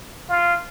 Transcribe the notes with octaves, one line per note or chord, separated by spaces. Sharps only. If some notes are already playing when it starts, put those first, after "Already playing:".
F4